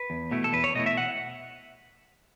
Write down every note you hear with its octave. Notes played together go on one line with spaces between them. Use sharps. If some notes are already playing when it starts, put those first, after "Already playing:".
Already playing: B4
E2
B2 A3 E4
A4
E2 B4
C#5
B2 A3 E4 D#5
E5
F#5